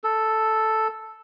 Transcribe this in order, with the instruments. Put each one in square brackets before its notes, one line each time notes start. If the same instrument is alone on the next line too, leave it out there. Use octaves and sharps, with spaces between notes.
[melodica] A4